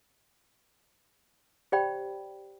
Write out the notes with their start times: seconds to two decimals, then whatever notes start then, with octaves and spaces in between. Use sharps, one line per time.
1.72 G4 C5 D5 G5 B5